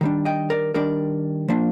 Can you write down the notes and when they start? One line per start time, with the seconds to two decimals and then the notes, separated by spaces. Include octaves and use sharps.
0.01 D#3 G3 D4
0.25 D#5 G5
0.50 A#4 D5
0.74 D#3 G3 D4 A#4 D5
1.48 F3 A#3 D4